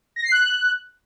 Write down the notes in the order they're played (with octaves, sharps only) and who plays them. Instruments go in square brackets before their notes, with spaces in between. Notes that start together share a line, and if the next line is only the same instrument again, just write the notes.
[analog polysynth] A#6
C7
F#6